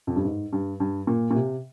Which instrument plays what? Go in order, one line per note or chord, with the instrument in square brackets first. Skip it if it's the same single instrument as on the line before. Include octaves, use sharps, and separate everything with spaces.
[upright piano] F2
G2
G#2
G2
G2
A#2
A#2
C3